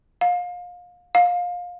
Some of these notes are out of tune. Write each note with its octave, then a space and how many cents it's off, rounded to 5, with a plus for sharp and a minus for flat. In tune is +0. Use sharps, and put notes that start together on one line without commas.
F5 +30
F5 +25